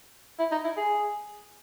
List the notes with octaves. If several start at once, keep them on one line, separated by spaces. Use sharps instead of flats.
E4
D#4
E4
G#4